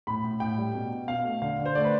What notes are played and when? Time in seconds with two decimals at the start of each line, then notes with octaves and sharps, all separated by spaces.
0.07 A2 B5
0.24 A2
0.40 A2 G5
0.58 G3
0.74 B2
0.91 B2
1.08 B2 F5
1.25 A3
1.42 D3 F5
1.59 D3
1.65 C5
1.75 A3 D5
1.84 B4